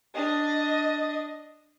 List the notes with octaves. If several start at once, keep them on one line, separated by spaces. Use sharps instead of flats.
D4 D#5